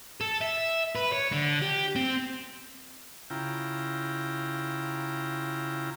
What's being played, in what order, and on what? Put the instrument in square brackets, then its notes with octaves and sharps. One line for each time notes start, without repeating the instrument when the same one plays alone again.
[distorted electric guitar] A4
E5
B4
C#5
D3
G4
C4
[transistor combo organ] C#3 E4 F4 G5 A#5